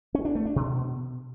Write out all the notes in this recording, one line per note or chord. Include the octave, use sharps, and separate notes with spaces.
C#4
D4
A3
D4
B2